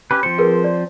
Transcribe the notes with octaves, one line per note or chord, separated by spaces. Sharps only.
C#4 G4 B4
F3 C4 C5 C#7
G#4 A#4 B4
D5